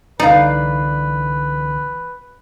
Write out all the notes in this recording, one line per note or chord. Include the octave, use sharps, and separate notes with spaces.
C2 D3 E3 D#4 B4 D5 F5